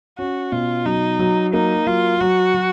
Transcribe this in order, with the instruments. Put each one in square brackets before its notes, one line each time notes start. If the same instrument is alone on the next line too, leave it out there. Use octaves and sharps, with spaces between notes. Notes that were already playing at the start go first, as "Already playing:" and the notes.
[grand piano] C#4 [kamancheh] F#4
[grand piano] B2 [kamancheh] F4
[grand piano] F#3 [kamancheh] D#4
[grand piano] F#3
[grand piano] A#3 [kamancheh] D#4
[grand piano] F#3 [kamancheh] F4
[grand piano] F#3 [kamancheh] F#4
[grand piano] F#3